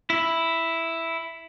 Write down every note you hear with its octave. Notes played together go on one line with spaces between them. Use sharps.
E4